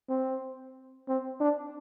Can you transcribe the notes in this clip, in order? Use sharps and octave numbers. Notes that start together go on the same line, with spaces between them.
C4
C4
D4